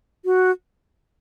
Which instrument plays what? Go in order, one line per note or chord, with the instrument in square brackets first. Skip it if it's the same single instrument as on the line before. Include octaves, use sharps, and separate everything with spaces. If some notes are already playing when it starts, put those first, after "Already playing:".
[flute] F#4